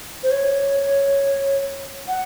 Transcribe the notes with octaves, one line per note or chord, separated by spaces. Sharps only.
C5
C#5
F#5